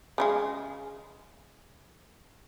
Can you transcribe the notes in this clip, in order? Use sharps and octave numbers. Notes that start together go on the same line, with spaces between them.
C#3 G3 G#3